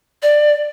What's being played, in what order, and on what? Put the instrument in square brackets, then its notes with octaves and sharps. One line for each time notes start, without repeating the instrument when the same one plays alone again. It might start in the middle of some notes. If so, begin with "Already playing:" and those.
[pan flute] D5